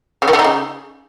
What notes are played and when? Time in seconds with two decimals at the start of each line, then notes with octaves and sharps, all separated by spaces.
0.22 C#3
0.28 D#3
0.33 D3
0.39 D#4
0.44 C#3